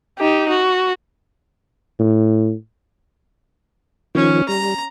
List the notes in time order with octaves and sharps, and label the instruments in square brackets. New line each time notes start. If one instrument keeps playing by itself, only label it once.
[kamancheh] D#4 G4
F#4
[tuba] A2
[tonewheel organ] D#3 F3 [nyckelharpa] C#4
[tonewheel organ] G3 [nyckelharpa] A#5